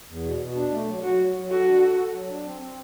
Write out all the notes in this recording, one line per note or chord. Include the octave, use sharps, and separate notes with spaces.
E2
B2
B2
D4
A3
F#3
F#3 F#4
F#3
F#3
F#4 A4
D4
A4
A4
F#3
D4
C4
C4